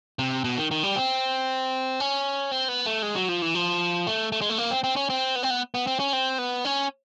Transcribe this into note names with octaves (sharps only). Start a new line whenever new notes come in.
C3
B2
D#3
D#3
G3
C4
C#4
C4
B3
A3
G#3
F#3
F3
E3
F3
A3
A3
G#3
A3
A#3
C4
C4
C#4
C4
B3
C4
B3
B3
C4
C#4
C4
B3
C#4